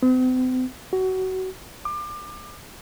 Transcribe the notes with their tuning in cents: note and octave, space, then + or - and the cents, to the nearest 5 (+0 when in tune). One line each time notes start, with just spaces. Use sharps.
C4 -45
F#4 +25
D6 +30